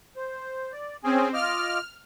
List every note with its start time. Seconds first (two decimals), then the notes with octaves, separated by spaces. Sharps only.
0.16 C5
0.72 D5
1.04 C4 C#4 G#4 G#5
1.34 F4 D#5 D6 F6